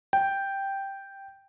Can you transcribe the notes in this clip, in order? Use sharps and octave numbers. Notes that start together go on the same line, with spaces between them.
G5